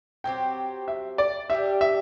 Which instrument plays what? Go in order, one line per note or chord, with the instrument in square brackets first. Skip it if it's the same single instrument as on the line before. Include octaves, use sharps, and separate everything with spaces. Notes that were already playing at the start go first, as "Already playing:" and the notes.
[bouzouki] F#3 C4 G4 [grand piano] G5
[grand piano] E5
D5
[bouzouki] G3 D4 G4 [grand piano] E5
[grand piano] E5